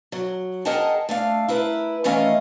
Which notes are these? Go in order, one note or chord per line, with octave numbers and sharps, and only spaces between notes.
F#3
G#4 A#4 D#5 F#5 G5 A5
A3 D4 F5
E4 A#4 B4
D#3 E3 A3 C#4 D#5 F5